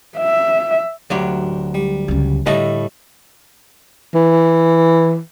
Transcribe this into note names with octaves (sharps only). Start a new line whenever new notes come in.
E5
D2 F#3 D4 G4
G3
C#2 C#4
A2 D3 G3 D#4 E4 D#5 A5
E3